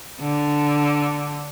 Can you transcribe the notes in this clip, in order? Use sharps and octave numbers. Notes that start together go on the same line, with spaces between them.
D3